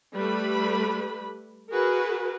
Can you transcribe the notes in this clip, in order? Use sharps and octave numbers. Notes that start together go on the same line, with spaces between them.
G3 A3 B4 B5
F#4 G#4 A#4 B4